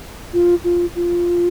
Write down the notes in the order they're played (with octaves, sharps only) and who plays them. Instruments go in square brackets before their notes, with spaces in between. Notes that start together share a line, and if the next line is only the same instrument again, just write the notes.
[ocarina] F4
F4
F4